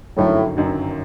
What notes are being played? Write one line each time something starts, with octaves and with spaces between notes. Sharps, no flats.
G1 F#2 A2 D#3 F#3
G1 F#2 D#3 F#3